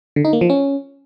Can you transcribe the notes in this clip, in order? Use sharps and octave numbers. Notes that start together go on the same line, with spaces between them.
D3
D#4
A#3
F3
C#4